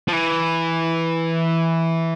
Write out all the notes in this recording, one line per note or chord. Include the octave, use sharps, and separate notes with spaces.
F3
E3